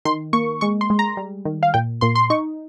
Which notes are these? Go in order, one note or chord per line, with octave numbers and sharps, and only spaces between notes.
D#3 C6
A#3 C#6
G#3 C#6
C6
G#3
A#5
G3
D#3
F5
A#2 G5
A#2 C6
C6
D#4 C#6